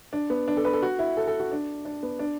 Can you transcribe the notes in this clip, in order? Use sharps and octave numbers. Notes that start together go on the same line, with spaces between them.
D4
B3
D4
A4
B4
A4
F#4
E4
A4
A4
F#4
D4
D4
B3
D4